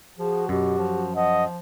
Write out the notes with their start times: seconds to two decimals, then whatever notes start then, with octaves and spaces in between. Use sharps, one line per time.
0.19 F3 F#4 G#4
0.49 F#2 B2 G4
0.78 F3
1.15 F3 D#5 F#5